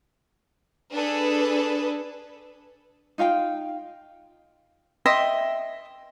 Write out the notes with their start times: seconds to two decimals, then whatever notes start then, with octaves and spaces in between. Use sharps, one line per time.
0.95 D4 G#4 A4 B4
3.18 D#4 F4 F5 G5
5.06 D#5 E5 G5 C6